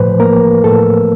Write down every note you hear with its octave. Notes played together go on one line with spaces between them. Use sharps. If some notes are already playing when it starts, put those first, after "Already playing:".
Already playing: A2 F3 B4 C5
A#3 A#4
A2 A4